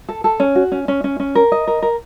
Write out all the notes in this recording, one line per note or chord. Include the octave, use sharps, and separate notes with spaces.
A4
A4
C#4
F#4
C#4
C#4
C#4
C#4
A#4
D#5
A#4
A#4